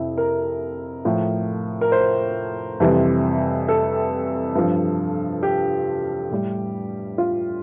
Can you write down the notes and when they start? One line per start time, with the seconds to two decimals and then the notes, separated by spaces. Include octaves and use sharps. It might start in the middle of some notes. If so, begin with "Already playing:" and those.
Already playing: F2 C3 E4
0.18 A#4
1.05 A2 F3
1.81 A#4
1.92 C5
2.80 F2 C3 E3 G3
3.68 A4
4.55 G2 F3
5.43 G4
6.31 A2 G3
7.18 F4